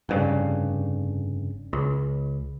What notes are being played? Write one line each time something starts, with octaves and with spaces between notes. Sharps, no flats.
F1 G2 C#3
C#2